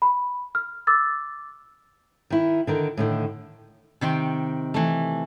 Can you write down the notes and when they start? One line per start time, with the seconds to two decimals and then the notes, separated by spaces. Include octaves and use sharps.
0.02 B5
0.55 F6
0.87 D6 E6 A6
2.30 D#3 E4
2.67 D3 D#3 A#4
2.97 A2 D3 D#3
4.01 C3 D#3 G5 C6
4.74 E3 A3